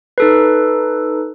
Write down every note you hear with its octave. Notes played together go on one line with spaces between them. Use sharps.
D#4 A4 B4